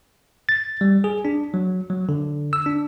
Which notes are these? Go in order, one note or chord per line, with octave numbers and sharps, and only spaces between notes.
A6
G3
G#4
D4
F#3
F#3
D3
E6
D4